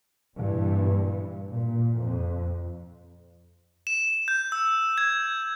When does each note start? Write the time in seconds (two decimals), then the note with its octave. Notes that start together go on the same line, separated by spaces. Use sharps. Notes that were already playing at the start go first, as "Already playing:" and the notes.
0.37 G2 A#2 E3
1.50 A#2
2.01 F2
3.87 E7
4.28 G6
4.52 E6
4.98 G#6